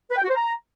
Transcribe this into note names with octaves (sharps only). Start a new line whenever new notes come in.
B4
G5
F#4
C5
A#5